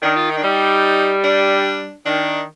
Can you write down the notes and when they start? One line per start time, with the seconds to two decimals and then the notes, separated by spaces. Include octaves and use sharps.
0.02 D#3 D4
0.16 F4
0.30 D#4
0.37 D4
0.43 G3 D#4
1.24 D4
2.05 D#3 D4